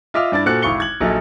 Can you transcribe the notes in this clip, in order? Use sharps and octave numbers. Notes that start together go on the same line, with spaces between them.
F4 D#5 E5 D6 F6
G2 D4 E4 A6
A#2 F#4 A4 C5 F#6 C#7
G#1 E4 F5 C#6 C#7 G7
G#6 F#7
A#1 F#3 D#4 A4 E5